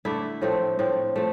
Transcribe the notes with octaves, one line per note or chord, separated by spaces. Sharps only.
D3 A3 D4 E4
A2 F3 A3 C4
A2 F3 C4
F3 A3